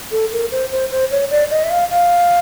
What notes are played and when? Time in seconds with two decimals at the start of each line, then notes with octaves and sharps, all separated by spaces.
0.12 A4
0.32 A#4
0.52 C5
0.71 C5
0.91 C5
1.11 C#5
1.31 D5
1.51 D#5
1.64 E5
1.71 F5
1.90 F5